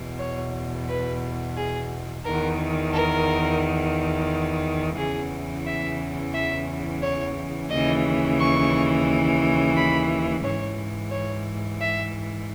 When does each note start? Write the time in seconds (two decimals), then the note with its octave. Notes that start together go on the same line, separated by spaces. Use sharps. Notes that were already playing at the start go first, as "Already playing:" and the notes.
Already playing: E2 B2
0.18 C#5
0.88 B4
1.56 G#4
2.24 E2 D#3 A#4
2.92 A#4
4.96 E2 C#3 E3 G#4
5.65 E5
6.32 E5
7.02 C#5
7.69 D#2 C#3 E3 D#5
8.38 C#6
9.75 B5
10.43 G#2 E3 C#5
11.10 C#5
11.79 E5